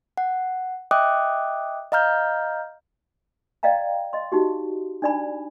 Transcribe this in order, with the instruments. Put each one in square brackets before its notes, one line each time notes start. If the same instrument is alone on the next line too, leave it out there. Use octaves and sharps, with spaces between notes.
[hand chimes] F#5
D#5 E5 G5 D6 D#6 F#6
D#5 F5 A#5 F6 G6
[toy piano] D5 D#5 F5 G5 A#5
D#5 C6
D#4 F#4 G4
D4 D#4 D5 G#5 B5